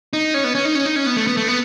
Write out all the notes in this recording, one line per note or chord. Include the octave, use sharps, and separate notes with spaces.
D#4
C#4
B3
C#4
D#4
C#4
D#4
C#4
B3
A3
B3
A3
B3